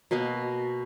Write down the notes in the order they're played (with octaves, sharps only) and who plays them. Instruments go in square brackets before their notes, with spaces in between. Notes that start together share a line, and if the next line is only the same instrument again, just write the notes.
[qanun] B2 A#3 D#5 F5